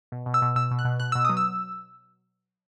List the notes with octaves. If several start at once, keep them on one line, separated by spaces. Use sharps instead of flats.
B2
B2
E6
B2
B2 E6
B2
F#6
B2
B2 F#6
B2 E6
F#3 D#6
E6